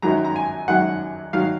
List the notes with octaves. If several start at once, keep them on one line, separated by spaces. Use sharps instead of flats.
F#2 D#3 F#3 A#5
A#5
G#5
F#2 D#3 F#3 F#5
D#3 F#3 F5